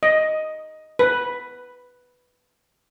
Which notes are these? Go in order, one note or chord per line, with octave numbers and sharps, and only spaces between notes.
D#5
B4